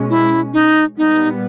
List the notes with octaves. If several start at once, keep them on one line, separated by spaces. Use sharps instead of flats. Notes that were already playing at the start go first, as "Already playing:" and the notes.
Already playing: B2 G#3 C#4
E4
D#4
A#2 G3 B3 D#4